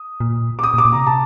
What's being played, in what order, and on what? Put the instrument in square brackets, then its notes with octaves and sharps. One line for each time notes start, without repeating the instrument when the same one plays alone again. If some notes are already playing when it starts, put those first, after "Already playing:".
Already playing: [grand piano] D#6
[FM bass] A#2
[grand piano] D6
D#6
[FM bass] A#2
[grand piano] D6
[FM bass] A#2
[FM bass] C3 [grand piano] A#5
[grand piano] A5